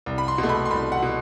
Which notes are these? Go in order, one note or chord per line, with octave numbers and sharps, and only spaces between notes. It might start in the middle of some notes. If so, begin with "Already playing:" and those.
C2
B5
C6
B2
A3
B5
C6
C2 B5
F#5
B2